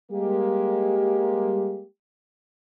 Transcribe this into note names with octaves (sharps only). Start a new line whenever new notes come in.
G3 G#3 A#3 G4